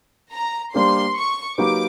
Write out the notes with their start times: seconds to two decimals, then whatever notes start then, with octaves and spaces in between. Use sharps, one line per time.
0.33 A#5
0.74 G3 A#3 D4 G4 C5 C6
1.16 C#6
1.58 F#3 A#3 D#4 G4 B4 D6